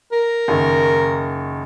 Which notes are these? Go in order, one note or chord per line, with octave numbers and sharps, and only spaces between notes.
A#4
F#1 D#3